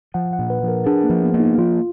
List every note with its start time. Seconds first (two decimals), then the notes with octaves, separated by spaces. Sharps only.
0.14 F3 F#5
0.33 F#5
0.39 A#2
0.50 B4
0.63 F3
0.68 A#4
0.86 D4 G#4
1.04 A#3
1.10 F3
1.22 B3
1.34 A#3
1.40 D#4
1.58 F3 F4